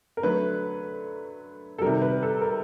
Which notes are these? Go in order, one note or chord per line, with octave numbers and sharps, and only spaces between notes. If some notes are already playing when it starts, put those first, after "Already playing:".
A#4
D3 F#3 A3 B4
A4
C3 D#3 G3 A#4
B4
A4
A#4